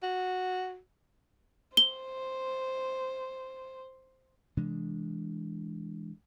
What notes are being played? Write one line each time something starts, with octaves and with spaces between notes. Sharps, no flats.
F#4
C5 G7
C3 E3 G#3 D4